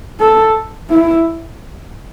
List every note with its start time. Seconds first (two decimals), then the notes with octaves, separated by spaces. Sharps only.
0.20 A4
0.90 E4